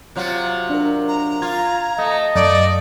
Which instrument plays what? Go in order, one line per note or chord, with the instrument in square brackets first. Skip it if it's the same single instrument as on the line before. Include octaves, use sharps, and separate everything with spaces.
[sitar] C3 F#3 F4
[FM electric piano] D4 A#4
[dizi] A#5
[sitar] F4 [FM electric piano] G#6
[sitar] A3 [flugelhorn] D#5
[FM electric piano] F#2 [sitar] A3 [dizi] D5